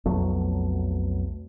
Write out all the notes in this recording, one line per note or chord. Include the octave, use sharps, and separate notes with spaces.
B1 F2 F#3 A3